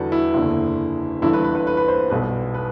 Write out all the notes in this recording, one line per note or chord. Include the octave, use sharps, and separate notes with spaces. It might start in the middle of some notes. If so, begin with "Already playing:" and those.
Already playing: E2 D3 G3 F#4 A4 B4
E4
F#1 E2 D3
G1 G2 E3 E4
B4
B4
B4
B4
B4
C5
B1 B2 G3 B4
B4